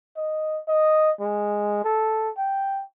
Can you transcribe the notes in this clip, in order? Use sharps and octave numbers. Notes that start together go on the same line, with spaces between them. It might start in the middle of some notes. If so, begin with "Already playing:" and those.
D#5
D#5
G#3
A4
G5